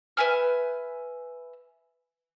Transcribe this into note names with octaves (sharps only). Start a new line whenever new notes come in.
B4 E5 G#5 F6